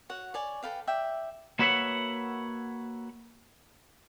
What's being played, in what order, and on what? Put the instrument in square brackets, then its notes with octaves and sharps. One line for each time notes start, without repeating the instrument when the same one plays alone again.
[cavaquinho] F#4 C#5 F#5
C#5 D5 G#5
A4 B4 F5 G5
D5 E5 G5
[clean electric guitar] A#3 F#4 B4 C#5 E5 F#5